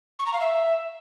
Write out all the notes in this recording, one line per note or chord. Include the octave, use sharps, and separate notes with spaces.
C#6
A#5
F5
E5